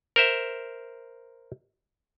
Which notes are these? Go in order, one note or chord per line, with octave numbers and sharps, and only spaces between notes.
A#4 C5 E5